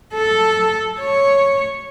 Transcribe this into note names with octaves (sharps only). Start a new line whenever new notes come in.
A4
C#5